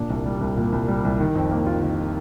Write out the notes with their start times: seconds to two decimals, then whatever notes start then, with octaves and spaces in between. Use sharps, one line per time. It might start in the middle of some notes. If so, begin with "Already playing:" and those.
Already playing: A#2 D4
0.10 C2
0.26 G3
0.41 C2
0.57 A#2
0.72 C2
0.88 G3
1.05 C2
1.20 D#3
1.35 F2
1.51 A#3
1.66 F4
1.82 D#3